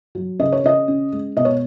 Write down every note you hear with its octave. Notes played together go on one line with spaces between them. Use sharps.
F#3
C#3 D#5
C#5
C#3 D#5
C#4
G#3
B2 D#5
C#5